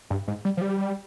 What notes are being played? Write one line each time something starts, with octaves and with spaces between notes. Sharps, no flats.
G2
G#2
G3
F3
G3